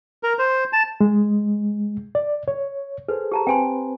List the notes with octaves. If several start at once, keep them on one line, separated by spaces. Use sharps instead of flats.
A#4
C5
A5
G#3
D5
C#5
G#4 A4 B4 C5
G4 A5 A#5
C4 B4 C5 G5 G#5 C6